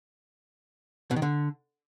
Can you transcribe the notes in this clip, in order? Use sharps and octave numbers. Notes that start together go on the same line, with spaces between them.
B2
D#3
D3